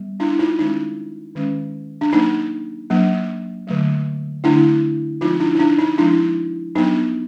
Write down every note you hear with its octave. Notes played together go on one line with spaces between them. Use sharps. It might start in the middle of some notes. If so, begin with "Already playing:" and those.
Already playing: G3 B3
D4 E4
D#4 F4
D#3 G#3 C#4 D#4
D#3 G#3 C#4
D4
F#3 A#3 D4 D#4
F#3 A#3 D4
D3 F#3 A3
D3 F#3 A3 D4 E4
F3 G#3 C4 D#4 F4
D4 E4
D#4
D4
D#4
F3 G#3 C4 D4 E4
F#3 B3 D4 D#4